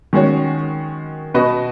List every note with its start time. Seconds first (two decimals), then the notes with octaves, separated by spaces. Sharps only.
0.13 D#3 G#3 C#4 F#4 C#5
1.34 B2 B3 F#4 B4 D#5